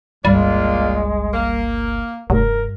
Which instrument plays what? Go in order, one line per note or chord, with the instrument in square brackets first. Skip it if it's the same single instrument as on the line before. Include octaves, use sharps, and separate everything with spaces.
[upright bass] G1 C#2 [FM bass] G3 [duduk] G#3 [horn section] A#3 D4 F4
[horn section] A#3
[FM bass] F1 [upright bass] G2 [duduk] A#4